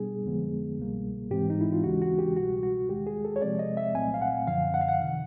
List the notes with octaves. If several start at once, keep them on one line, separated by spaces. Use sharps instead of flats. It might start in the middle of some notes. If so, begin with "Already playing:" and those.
Already playing: B2 G3 B3 D4 G#4
F2 D3 F3 G#3 B3
C2 B2 G3 A#3
G#2 E3 G#3 C4 G4
D#4
E4
F4
D#2 C#3 E3 G#3 C#4 F#4
F#4
G4
C2 B2 G3 F#4
F#4
D#2 D#3 G#3 G4
G#4
A4
C#5
C3 F3 G#3 C4 D5
D#5
E5
C2 A#2 F#3 A3 C4 G#5
F5
F#5
F#2 D3 F3 F5
F#5
F5
F#5
C3 D#3